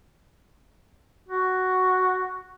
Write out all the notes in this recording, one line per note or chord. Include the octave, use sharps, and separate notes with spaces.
F#4